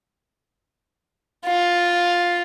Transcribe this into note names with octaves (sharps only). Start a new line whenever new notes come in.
F4